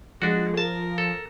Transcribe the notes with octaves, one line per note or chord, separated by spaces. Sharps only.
F3 G#3 D4 F#4
A#4 A5
A4